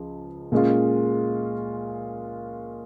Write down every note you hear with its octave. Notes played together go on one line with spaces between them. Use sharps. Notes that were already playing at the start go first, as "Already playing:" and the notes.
Already playing: C#2 F3
A#2 G#3 C#4 F4